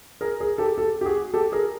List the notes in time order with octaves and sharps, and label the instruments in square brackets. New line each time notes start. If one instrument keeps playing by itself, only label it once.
[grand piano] G#4 A#4
G#4 A#4
G4 A4
G4 A4
G4
F#4 G#4
G4 A4
G#4 A#4